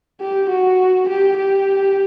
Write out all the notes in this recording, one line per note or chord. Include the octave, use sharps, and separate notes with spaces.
G4
F#4
G4
G4